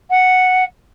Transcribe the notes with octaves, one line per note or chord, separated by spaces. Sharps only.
F#5